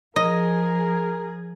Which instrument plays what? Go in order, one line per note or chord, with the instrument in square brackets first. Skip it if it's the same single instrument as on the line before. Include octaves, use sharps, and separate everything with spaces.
[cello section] F3 G#4 [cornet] A#4 [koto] D#5